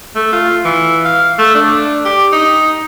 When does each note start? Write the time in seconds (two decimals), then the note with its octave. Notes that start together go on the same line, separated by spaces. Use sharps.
0.16 A3
0.33 F4
0.65 E3
1.05 F5
1.38 A3
1.55 D4
2.05 G4
2.32 D#4